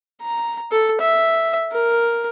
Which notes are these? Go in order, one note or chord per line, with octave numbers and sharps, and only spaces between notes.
A#5
A4
E5
A#4